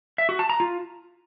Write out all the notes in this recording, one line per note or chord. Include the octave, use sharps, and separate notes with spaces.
E5
F#4
A5
A#5
F4